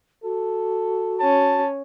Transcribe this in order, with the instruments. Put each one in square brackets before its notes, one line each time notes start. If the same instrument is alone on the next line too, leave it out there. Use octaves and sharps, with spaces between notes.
[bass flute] F#4 [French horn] A4
[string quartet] C#4 [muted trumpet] A5